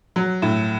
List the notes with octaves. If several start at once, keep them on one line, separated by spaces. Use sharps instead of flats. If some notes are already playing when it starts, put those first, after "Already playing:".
F#3
A2